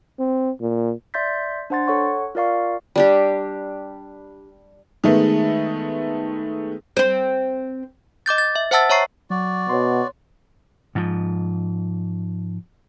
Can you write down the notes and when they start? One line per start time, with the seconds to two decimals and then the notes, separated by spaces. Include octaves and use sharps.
0.19 C4
0.61 A#2
1.14 D5 E5 C6 G6 A6 B6
1.70 D4 C5 F#5 C6 A6
1.88 A4 C#5 F#5 C#6
2.35 F4 A#4 D5 F5 C#6
2.96 G3 D4 G4
5.04 D#3 G#3 A3 B3
6.97 C4 C5
8.26 D#5 D6 G6 A6
8.38 A6
8.56 E5
8.71 C5 E5 F#5 A5 E6 A6
8.90 C#5 E5 A#5 C#6 C7
9.30 F#3 F#4 D5
9.69 B2 C#5 C6
10.95 G#2 F3